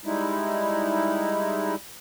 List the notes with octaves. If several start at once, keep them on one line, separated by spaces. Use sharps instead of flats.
G3 G#3 D#4 E4